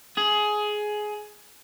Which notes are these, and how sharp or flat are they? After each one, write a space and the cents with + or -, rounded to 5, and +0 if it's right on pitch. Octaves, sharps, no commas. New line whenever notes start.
G#4 +15